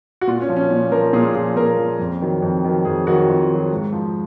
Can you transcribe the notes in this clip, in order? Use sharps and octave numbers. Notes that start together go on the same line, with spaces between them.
F#4
A#2 F4
C#4
F3
C#4
A#2
F3 A#4
A#2 G#4
F3 G#4
A#2 A#4
F3
F2
D#3 F#3
F2
D#3 F#3
F2 G#4
D#3 F#3 F#4
F2 F4
D#3 F#3
G#2
F3